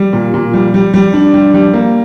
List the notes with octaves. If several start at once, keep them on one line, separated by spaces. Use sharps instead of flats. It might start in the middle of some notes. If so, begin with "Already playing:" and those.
Already playing: G3
A#2
A#2
G3
G3
G3
D4
G3
G3
A#3